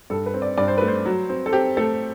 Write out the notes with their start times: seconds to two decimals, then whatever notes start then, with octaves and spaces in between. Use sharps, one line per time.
0.10 G2 A4
0.26 B4
0.34 C4
0.42 D5
0.57 G2 D5
0.68 C5
0.78 A3 B4
0.88 C5
1.05 F#3
1.29 C4
1.46 A4
1.53 C4 G4
1.77 A3 A4